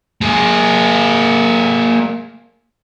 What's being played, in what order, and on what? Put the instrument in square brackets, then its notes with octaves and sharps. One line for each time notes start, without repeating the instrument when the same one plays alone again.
[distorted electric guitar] A#3 G#4